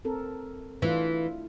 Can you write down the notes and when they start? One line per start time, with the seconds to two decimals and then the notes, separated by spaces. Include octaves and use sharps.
0.05 C4 A4 A#4
0.82 E3 A3 D4 F4